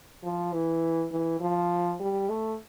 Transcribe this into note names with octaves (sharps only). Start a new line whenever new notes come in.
F3
E3
E3
F3
G3
A3